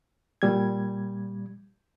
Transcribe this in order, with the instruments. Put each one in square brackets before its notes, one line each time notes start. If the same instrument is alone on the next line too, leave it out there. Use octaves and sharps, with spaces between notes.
[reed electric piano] A#2 G3 G#6